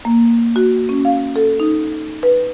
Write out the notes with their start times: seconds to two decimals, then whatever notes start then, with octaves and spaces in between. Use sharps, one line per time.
0.05 A#3
0.56 F#4
0.89 C#4
1.05 F5
1.36 A4
1.60 D#4
2.23 B4